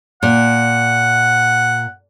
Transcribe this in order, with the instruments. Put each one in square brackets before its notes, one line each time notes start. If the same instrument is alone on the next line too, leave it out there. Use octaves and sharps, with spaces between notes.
[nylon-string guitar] A#2 [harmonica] F#5